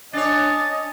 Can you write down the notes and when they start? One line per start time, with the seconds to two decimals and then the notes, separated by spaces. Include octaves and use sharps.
0.13 C#4 D4 C#5 D#5 A6